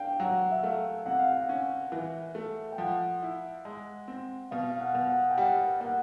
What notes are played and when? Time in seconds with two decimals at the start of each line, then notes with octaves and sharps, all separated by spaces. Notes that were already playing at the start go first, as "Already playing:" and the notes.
Already playing: D4 F5 G5
0.20 F#3 F#5
0.52 E5
0.63 A3 F5
1.06 C3 F#5
1.19 F5
1.32 F#5
1.49 C#4
1.92 E3
2.35 A3
2.72 G5
2.78 F3 F#5
3.22 E4
3.65 G#3
4.08 C4
4.51 B2 F5
4.71 F5
4.80 F#5
4.95 B2
5.09 F#5
5.31 G5
5.38 G3 F#5
5.80 A#3 F#5